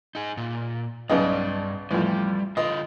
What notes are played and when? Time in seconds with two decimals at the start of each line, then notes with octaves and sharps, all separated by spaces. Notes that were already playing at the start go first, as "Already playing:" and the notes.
0.15 D#4 G#4
0.37 A#2
1.10 B1 G2 C#3 D5 D#5
1.91 A1 F2 G3
2.57 D3 F4 D#5